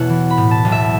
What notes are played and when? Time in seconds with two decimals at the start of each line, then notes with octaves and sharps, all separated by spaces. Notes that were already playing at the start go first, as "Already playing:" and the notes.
Already playing: E2 B2 C#5 E5 F#5
0.09 E3
0.30 B5
0.37 A2
0.51 A5
0.65 B1
0.72 E5